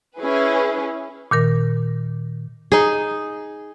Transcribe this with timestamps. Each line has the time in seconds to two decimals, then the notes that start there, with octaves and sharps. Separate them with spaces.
0.18 C#4 E4 G#4 B4
1.31 A#2 D#3 A#4
2.72 D#4 G#4